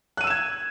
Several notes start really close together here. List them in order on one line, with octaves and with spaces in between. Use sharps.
F#6 D#7 E6 E7 G#6